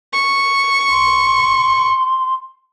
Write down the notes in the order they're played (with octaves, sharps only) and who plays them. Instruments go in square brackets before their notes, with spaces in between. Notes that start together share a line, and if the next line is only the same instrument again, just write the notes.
[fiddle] C#6
[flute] C6